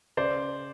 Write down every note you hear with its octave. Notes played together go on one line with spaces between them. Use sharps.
C#3 C5 D5